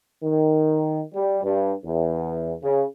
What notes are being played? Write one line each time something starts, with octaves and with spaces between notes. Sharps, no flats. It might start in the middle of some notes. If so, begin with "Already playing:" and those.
D#3
G3
G2
E2
C#3